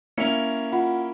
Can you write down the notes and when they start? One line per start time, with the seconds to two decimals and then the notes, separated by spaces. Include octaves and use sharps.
0.18 A#3 C#4 E4 C#7 F7
0.72 F4 F#5 B5